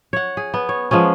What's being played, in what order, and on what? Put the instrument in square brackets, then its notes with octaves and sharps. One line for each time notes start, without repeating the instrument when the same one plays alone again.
[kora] C#5 F#5
G#4
B3
C#5
F3 G#3 B3 C#4